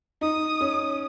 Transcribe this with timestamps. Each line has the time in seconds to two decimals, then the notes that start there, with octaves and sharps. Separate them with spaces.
0.21 D#4 D#6
0.61 C#4